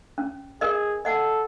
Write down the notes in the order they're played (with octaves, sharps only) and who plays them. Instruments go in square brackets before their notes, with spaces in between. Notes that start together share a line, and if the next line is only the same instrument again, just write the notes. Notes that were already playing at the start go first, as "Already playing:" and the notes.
[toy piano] C#4
[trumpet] G#4 [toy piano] A#4 D#5
[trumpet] A4 [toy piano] D#5 F#5